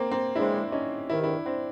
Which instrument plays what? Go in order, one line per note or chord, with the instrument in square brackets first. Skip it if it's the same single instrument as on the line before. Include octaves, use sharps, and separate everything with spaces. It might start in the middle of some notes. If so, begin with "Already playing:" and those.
Already playing: [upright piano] A#3 C4
A#3 C4
[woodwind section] C#3 E3 G#3 C4 [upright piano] D4 E4
[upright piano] C#4 D#4
[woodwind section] E2 C3 D#3 [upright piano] E4
[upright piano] D4 E4
C4 D4